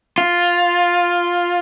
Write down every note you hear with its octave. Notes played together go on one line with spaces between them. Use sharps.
F4